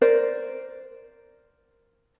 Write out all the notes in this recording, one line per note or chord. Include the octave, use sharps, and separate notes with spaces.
A#4 C5 D5